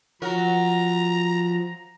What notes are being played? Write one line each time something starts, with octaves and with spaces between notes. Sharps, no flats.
F3 F#3 F#4 A#4 A#5